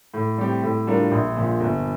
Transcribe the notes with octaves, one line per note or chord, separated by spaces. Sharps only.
A2
G3 C4 G4
A2
G3 D4 F4 A#4
A#1
A#2 F3
G1